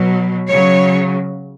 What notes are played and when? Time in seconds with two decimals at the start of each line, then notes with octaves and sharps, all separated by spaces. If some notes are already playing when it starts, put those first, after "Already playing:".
Already playing: B2 F#3
0.49 C#3 F#3 C#5